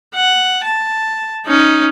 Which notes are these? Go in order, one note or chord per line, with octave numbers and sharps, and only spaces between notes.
F#5
A5
C#4 D#4